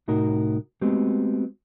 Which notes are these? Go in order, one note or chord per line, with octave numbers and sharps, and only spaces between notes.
C2 A2 D#4 F#4 A#4
G#3 A3 B3 C4 F#4 G4